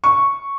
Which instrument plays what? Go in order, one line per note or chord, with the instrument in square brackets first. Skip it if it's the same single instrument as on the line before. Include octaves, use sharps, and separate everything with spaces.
[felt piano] C#6